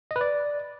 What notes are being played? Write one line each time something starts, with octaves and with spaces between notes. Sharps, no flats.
D#5
B4
D5